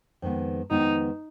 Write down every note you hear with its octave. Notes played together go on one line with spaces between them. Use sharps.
F2 D#3 G#3 B3
F2 D#3 G#3 B3 D#4